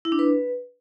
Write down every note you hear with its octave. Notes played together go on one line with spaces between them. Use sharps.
E4
D4
B4